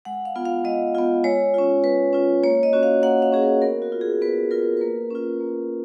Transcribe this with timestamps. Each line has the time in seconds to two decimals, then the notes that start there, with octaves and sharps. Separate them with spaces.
0.05 G#3 F#5
0.25 F5
0.36 B3 F4
0.46 F5
0.64 G#3 D#5
0.95 B3 F4
1.24 G#3 C#5
1.54 C#4 F4
1.84 G#3 B4
2.13 C#4 F4
2.43 A#3 C#5
2.63 D#5
2.73 C#4 F#4
2.83 F5
3.03 A#3 F#5
3.22 F5
3.32 C#4 F#4 G#4
3.42 A#4
3.62 B3 A#4
3.82 F#4
3.92 F4
4.01 G#4
4.22 B3 B4
4.51 F4 A#4
4.62 B4
4.77 B4
4.81 A#3 A#4
5.11 C#4 F4
5.41 A#3